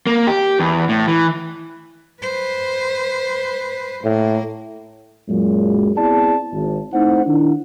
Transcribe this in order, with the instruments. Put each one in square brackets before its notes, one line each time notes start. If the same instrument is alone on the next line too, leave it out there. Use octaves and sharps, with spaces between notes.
[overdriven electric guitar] A#3
G4
E2
A2
E3
[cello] B4 C5
[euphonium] A2 [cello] A#3
[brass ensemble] F#2 A#2 F#3 G#3
B3 C4 E4 G#4 D5 A5
G#1
A3 C4 D#4 E4 C5 F#5
D#3 D4 E4